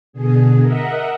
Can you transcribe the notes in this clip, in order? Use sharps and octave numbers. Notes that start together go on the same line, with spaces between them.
B2 D3 G#4
A#4 D#5 E5 F#5